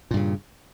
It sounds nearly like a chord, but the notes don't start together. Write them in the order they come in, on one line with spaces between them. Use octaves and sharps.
A#2 G2 C#3